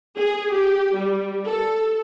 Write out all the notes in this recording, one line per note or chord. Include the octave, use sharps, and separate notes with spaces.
G#4
G4
G3
A4